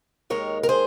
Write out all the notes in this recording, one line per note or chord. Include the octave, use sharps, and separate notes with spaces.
D#2 D#3 G#3 A#4 C#5
A#4
G#4 C5